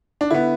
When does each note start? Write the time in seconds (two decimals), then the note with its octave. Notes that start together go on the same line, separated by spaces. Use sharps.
0.21 D4
0.31 D3 B3 E4